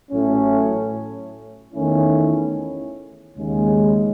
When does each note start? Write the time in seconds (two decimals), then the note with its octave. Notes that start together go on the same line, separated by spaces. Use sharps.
0.11 A1 A2 F#3 A3 C#4
1.74 E2 D#3 A3 C#4 E4
3.36 D#2 C#3 G#3